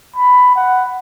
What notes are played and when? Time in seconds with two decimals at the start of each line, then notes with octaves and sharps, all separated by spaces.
0.17 B5
0.56 F#5